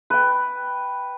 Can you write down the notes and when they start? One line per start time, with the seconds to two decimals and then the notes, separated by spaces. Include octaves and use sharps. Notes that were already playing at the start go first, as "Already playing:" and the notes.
0.10 B4 G5